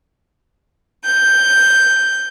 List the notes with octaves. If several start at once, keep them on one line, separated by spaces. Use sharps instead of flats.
G6